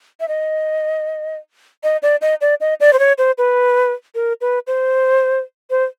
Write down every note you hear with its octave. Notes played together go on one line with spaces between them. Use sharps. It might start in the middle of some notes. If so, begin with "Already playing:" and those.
E5
D#5
D#5
D5
D#5
D5
D#5
D5
C5
C#5
C5
B4
A#4
B4
C5
C5